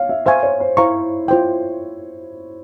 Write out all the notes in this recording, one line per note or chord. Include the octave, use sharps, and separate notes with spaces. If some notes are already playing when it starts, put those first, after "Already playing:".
Already playing: C#5 F5
E5
C5 E5 F5 G#5 C#6
C#5
C5
E4 C5 F5 A#5 C#6
F4 C5 G5